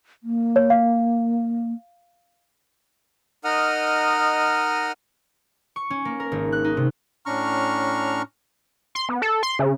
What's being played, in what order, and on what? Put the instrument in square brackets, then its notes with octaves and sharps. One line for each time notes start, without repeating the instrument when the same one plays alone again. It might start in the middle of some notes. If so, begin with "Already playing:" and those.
[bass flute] A#3
[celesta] C#5
F5
[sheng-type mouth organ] D#4 A#4 D#5 F#5 D#6 F6
[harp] C#6
C#4
A#3
A#4
G#1
F#6
D#4
C3
[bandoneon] A2 C#4 D4 A#5 C#6 F6
[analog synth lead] C6
B3
A4
C6
C#3